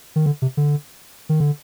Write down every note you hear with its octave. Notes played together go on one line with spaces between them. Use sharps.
D#3
D3
C3
D3
D#3
D3